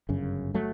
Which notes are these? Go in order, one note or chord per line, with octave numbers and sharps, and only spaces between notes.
G1 F#2 C#3
F#3 A3